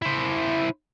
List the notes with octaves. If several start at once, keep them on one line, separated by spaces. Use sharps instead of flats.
E4 C5